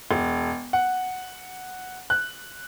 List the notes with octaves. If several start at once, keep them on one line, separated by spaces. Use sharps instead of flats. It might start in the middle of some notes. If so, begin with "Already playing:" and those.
E1
F#5
F#6